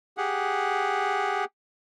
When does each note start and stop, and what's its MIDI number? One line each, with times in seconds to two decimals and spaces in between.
0.18 1.45 67
0.18 1.45 68
0.18 1.45 78